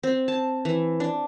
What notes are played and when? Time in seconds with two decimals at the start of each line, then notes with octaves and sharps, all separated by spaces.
0.03 C4
0.28 A5
0.65 E3
1.00 D4